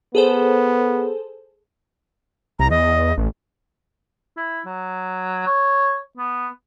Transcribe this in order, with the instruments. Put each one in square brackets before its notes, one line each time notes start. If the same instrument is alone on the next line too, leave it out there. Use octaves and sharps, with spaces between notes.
[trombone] B3 [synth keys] G#4 A4 C5
[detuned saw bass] C2 [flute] A#5
[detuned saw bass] E2 [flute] D#5
[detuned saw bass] A1
[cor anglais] E4
F#3
C#5
B3